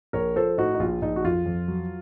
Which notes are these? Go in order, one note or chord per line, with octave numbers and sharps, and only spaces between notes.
A#1 A#4 C#5
F3 A4 C5
A2 D#4 F#4
D#4
A#1 F4
A#1 D#4
F#4
F2 F4
F2
F#3